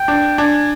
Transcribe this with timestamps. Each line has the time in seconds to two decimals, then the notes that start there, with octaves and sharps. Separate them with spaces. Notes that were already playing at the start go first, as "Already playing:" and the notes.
Already playing: G5
0.08 D4
0.38 D4 G#5